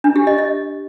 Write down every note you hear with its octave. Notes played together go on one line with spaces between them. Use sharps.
D4
G4
D#5
D#5